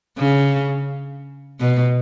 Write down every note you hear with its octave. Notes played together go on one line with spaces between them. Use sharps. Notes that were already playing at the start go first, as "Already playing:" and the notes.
C#3
B2